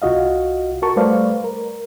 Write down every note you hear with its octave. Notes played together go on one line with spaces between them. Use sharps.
C2 F4 F#4 D#5 F5
F#4 A#4 A5 C#6
G3 A3 B4 C5 D5 F5
A#4